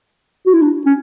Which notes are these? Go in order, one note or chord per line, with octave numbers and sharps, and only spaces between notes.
F#4
E4
D4
C#4